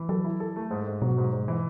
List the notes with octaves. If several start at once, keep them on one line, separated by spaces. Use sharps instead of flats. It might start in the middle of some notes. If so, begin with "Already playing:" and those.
Already playing: E3
F#3 A4
E4
A4
A3
G#2
G#2
B2 F#3
G#2
G#2
E3